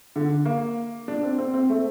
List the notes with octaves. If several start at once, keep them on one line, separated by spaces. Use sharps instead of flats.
D3
A#3
D4
C4
C4
C4
A3